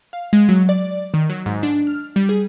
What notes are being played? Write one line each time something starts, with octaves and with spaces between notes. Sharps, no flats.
F5
G#3
F#3
D5
D#3
F#3
G#2
D4
F6
G3
G#4